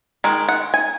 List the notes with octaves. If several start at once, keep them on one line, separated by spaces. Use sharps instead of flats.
D#3 G#3
F#5
G#5